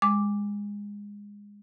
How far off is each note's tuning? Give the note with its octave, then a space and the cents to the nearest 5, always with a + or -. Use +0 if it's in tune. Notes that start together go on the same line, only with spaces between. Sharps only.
G#3 -20 D6 +0